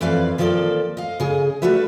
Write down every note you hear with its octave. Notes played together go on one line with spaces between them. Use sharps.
F2 E3 E4 B4 D5 F5
D#3 F3 A#3 C#4 A4 D5
D#5 F5
C#3 G#4
G3 A3 D4 F#4 B4 E5